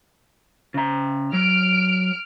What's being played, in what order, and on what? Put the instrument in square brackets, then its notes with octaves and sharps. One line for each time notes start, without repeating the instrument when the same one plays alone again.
[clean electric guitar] C#3 A#5
[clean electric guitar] F#3 [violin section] F6 D7